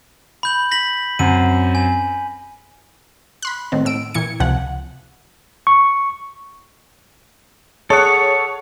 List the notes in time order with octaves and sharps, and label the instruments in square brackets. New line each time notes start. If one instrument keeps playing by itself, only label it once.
[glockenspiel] B5 G6 F#7
A#6 B6 F#7
[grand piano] F#2 C4 F#5 [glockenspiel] D#7
[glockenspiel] G#5
[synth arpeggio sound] B5 C6 F#6
A2 D#3 C4
A2 E6 D7
A#2 E3 G#6 C#7
C#2 C3 F3 F#5
[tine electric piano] C#6
[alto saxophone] G#4 [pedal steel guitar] A4 F#5 [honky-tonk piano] C#5